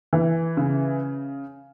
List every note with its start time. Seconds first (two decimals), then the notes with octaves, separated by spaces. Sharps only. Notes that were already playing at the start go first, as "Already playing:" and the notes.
0.13 E3
0.57 C#3